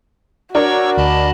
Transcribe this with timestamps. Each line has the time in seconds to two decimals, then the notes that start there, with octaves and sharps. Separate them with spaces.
0.55 D4 F#4 A#4 C#5 C#6 E6
0.98 D2 D#5 A5 B5